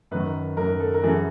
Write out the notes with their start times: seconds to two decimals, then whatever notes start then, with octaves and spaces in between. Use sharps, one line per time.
0.11 F#2 D#3 B4
0.57 F#2 D#3 A#4
0.80 A4
0.94 A#4
1.03 F#2 C#3 E3 A4